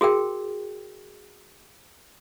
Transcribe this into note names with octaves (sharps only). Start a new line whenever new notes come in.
F#4 G#4 A#4 G5